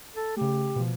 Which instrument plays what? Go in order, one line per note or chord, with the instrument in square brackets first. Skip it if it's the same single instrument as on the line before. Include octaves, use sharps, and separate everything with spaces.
[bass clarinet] A4
[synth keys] C#3 A3 [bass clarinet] G4
[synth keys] B2 F3